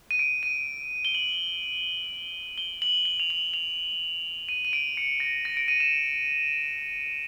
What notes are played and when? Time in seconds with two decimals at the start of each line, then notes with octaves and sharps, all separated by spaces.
0.11 D#7
0.19 D7
0.43 D#7
1.05 G7
1.15 F#7
2.58 G7
2.82 F#7
3.05 G7
3.20 F7
3.30 F#7
3.54 F7
4.49 D#7
4.65 D#7
4.73 D7
4.97 C#7
5.20 A#6
5.45 A#6
5.57 D7
5.68 D#7
5.80 E7